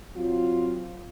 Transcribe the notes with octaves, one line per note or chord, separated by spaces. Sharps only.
F#3 C4 F4